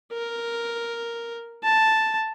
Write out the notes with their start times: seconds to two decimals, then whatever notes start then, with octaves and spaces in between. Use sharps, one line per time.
0.13 A#4
1.64 A5